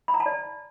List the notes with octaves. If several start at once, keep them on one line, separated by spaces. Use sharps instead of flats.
B5
A#5
A5
D5